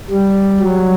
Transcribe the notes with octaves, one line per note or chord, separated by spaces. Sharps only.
G3
F#3